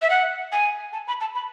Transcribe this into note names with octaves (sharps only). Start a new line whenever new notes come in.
E5
F#5
G#5
A5
B5
A5
B5